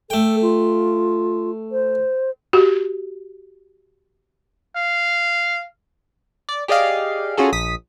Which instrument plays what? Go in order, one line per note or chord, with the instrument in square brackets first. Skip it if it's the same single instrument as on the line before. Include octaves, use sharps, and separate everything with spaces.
[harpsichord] A3 G5 [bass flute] A4
[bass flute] F4
C5
[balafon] F#4 G4
[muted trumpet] F5
[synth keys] D5
G4 G#4 D5 D#5 F5
C#4 F4 F#4 G#4 A4
A#1 D#6 B6